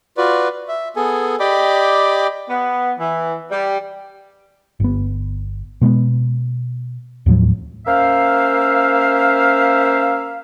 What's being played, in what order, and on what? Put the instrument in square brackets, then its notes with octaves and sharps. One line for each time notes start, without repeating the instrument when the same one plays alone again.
[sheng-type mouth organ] F4 F#4 B4 D5
E5
B3 G#4 A4 G#5
G4 D5 D#5 G5 B5 D6
[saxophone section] B3
E3
G3
[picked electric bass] G1 B3
B2 G#3 A#3 B3
D#2 A2 F3 F#3
[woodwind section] A#3 C#4 C5 E5 F5